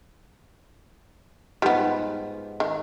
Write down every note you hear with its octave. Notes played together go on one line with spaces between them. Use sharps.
G#2 G3 B3 F4
D#3